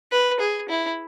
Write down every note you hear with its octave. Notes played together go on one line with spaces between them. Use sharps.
B4
G#4
E4